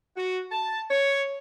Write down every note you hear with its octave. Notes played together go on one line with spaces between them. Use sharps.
F#4
A5
C#5